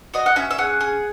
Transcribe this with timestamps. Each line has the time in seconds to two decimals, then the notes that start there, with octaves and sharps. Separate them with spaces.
0.14 F#4 D#5
0.26 F#5
0.36 C#4 E5
0.51 E5
0.58 G#4 F#5
0.81 G#4